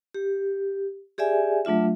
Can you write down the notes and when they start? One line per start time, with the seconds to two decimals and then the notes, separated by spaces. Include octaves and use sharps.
0.14 G4
1.18 G4 G#4 D5 E5 G#5
1.65 F#3 A3 D4 F4 E5